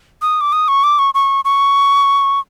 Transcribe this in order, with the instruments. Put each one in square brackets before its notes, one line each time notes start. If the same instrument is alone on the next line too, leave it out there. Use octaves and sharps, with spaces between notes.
[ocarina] D#6
D6
D#6
C#6
D6
C#6
C#6
C#6